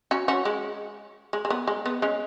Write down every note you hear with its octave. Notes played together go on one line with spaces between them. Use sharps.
C#4 F#4
C#4 F#4
G#3
G#3
G#3
B3
G#3
B3
G#3 C#4